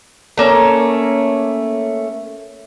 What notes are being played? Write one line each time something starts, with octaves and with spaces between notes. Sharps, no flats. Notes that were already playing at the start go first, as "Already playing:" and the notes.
A3 A#3 C#4